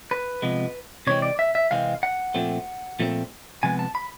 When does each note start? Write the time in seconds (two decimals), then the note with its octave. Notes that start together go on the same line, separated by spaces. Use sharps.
0.11 B4
0.42 C3 F3 G#3 B3
1.07 C3 E3 G#3 C4 C#5
1.22 D5
1.39 E5
1.55 E5
1.71 C3 E3 G#3 C4 F5
2.03 F#5
2.34 A#2 F3 A3 C4
2.99 A#2 F3 A3 C4
3.63 C3 F3 G#3 B3 G#5
3.79 A5
3.95 B5